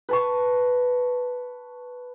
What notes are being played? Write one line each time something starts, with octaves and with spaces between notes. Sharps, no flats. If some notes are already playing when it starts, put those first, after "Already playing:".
B4 A5 C#6